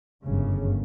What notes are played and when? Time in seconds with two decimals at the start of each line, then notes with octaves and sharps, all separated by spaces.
0.23 G1 F#2 C#3